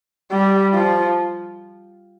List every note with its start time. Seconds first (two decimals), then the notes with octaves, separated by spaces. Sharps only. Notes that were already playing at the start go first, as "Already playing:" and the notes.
0.31 G3
0.74 F3